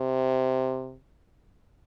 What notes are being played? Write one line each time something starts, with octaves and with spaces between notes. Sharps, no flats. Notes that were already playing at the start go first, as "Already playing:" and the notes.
Already playing: C3